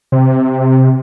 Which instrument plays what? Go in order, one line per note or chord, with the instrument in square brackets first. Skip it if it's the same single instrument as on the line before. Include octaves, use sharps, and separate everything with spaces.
[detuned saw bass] C3